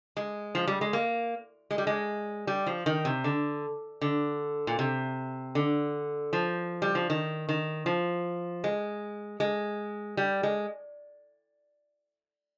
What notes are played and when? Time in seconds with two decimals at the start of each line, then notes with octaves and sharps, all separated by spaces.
0.17 G#3
0.55 F3
0.67 G3
0.81 G#3
0.93 A#3
1.71 G#3
1.78 G3
1.87 G#3
2.47 G3
2.66 F3
2.86 D#3
3.05 C3
3.24 D3
4.01 D3
4.67 A#2
4.79 C3
5.55 D3
6.33 F3
6.82 G3
6.95 F3
7.10 D#3
7.49 D#3
7.86 F3
8.64 G#3
9.40 G#3
10.17 G3
10.43 G#3